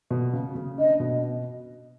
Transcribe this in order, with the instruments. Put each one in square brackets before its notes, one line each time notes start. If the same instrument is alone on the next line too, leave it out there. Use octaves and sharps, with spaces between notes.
[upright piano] B2
C#3
C#3
[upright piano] D4 [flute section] D#5
[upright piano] B2